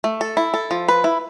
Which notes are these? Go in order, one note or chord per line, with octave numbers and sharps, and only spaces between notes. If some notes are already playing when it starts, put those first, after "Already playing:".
A3
A4
E4
A4
F3
B4
E4